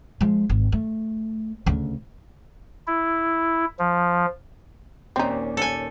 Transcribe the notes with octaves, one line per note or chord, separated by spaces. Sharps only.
F3 G#3
G#1
A3
D2 C#3
E4
F3
D#2 A#2 C4 C#4 D#4
A4 G#5